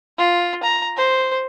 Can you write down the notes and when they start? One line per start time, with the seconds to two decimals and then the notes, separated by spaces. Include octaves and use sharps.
0.18 F4
0.63 A#5
0.97 C5